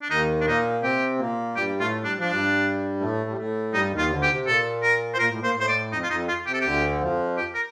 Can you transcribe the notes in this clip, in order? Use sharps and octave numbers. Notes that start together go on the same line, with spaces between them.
D4
D#2 D#3 D#4
D4
A#2 A#3 D#4
C3 C4 G4
A#2 A#3
G2 G3 G4
A2 A3 F4
G3 D4
F3 D4
G2 G3
A2 A3
G3
A2 A3
G2 G3 D#4
D#2 D#3
F4
D2 D3
G4
C3
A#2 A4
A#4
C5
A#2 A#4
A2
A#2 C5
A2
C5
D5
F2 D#4
F4
F2 D#4
F4
C3 G4
A4
D2 D3 G4
F2 F3
G4
A#4